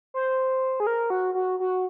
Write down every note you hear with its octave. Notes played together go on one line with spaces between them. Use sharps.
C5
G#4
A#4
F#4
F#4
F#4